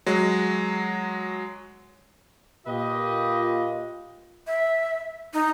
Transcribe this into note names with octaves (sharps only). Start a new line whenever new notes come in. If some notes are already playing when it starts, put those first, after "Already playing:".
F#3 G#3
A#2 F4 G4 B4 D#5
E5
D#4